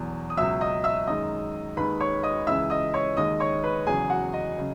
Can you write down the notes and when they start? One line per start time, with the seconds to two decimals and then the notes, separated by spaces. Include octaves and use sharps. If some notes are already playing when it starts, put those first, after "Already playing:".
Already playing: E2 B2 F#3
0.30 D#6
0.37 C#2 B2 F#3 E5 E6
0.61 D#5 D#6
0.84 E5 E6
1.07 F#2 D#3 G#3 D#5 D#6
1.77 D#2 D#3 G#3 B4 B5
2.00 C#5 C#6
2.23 D#5 D#6
2.47 C#2 C#3 E3 G#3 E5 E6
2.70 D#5 D#6
2.94 C#5 C#6
3.17 D#2 D#3 G#3 D#5 D#6
3.40 C#5 C#6
3.63 B4 B5
3.86 E2 C#3 F#3 G#4 G#5
4.10 F#4 F#5
4.33 D#5
4.57 C#3 F#3